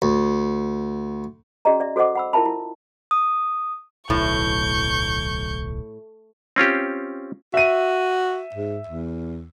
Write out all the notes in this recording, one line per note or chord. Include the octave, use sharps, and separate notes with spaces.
D2
C#4 F#4 G#4 D5 D#5 A#5
D5 E5
F#4 A4 C5 D#5 F#5 D6
F#5 B5 E6
E4 F4 A#4 E5 A5 B5
E4
D#6
D1 B1 A2 C#6 G6
C4 C#4 F4 G4
F#4 E5 D#7
G#2
E2